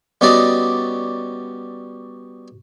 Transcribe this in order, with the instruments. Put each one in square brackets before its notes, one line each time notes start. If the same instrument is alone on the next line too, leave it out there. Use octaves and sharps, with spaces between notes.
[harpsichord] G3 B3 C#4 F#4 D5 D#5